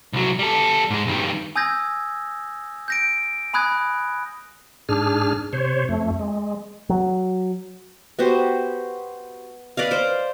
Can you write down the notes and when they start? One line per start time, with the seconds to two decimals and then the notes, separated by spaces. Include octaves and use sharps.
0.13 C2 F#3
0.39 G3 A4
0.90 G#2 G#3
1.07 G2 D#3
1.56 G#5 D#6 E6 G6 G#6 A#6
2.88 G6 A#6 D7
3.54 G#5 B5 D#6 F#6 G#6
4.89 G#2 D4 G#4 F6
5.53 C3 C5 C#5
5.89 F2 A3
6.19 G#3
6.89 F#3
8.19 B3 F#4 G4 C5
9.77 B4 D5 D#5 F5
9.91 C5 D6